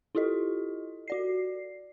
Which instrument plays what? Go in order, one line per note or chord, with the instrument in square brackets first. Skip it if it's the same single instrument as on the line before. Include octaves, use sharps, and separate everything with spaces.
[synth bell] E4 F4 G4 A4 D#5
F#4 D5 C7